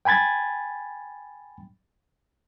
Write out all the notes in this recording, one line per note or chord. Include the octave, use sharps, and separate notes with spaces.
G5 G#5 B5 G#6 A6